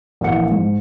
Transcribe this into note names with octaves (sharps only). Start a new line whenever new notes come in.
A#1 E3 A#3 E4 F#5 C#7
G#2